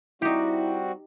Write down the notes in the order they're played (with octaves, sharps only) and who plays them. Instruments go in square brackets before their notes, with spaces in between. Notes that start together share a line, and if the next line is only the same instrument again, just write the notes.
[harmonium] G3 C4 F#4 [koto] D#4 G4 [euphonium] E4